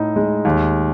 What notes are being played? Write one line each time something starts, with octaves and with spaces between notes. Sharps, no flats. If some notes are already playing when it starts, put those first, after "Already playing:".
Already playing: A2 D#4
G#3
D#2